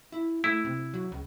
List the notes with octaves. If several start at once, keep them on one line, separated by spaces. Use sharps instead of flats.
E4
A3 E4
C3
F#3
C#2